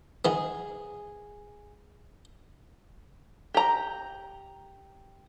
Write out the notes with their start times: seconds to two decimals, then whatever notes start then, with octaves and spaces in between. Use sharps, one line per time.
0.25 D#3 B3 G#4
3.54 G4 A#5